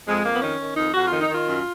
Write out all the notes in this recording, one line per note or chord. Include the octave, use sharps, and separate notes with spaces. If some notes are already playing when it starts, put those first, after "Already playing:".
F2 G#3
F2 A#3
B3
D#3 C#4
D#3
F2 D#4
F2 F#4
D#3 F4
D#4
D#3
F4
F#2